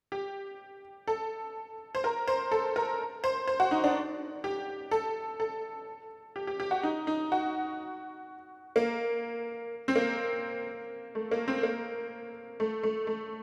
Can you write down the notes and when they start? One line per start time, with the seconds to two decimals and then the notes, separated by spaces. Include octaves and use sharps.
0.12 G4
1.07 A4
1.95 C5
2.04 A#4
2.28 C5
2.52 A4
2.76 A#4
3.24 C5
3.48 C5
3.60 F#4
3.71 D#4
3.84 D4
4.44 G4
4.91 A4
5.40 A4
6.36 G4
6.47 G4
6.60 G4
6.71 F#4
6.83 D#4
7.07 D#4
7.32 F#4
8.76 A#3
9.88 C4
9.96 A#3
11.15 A3
11.31 A#3
11.48 C4
11.63 A#3
12.60 A3
12.83 A3
13.07 A3